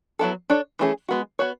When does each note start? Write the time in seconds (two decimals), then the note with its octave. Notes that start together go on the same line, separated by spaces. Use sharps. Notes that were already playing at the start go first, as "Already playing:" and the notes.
0.19 F#3 B3 E4 A4
0.50 D4 A4 C#5
0.79 E3 A3 C#4 G#4
1.09 G#3 B3 F#4
1.39 B3 F#4 C#5